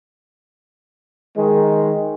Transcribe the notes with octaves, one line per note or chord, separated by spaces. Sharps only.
D#3 G#3